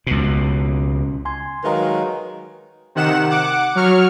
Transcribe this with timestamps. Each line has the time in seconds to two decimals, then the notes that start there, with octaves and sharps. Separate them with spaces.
0.07 C#2 B2
1.25 G#5 C6 G#6
1.64 D#3 F#3 G#3 B4 F5 A#5
2.95 C3 D#3 F#5 E7
3.30 F#5 D6
3.75 F#3 C#6 F6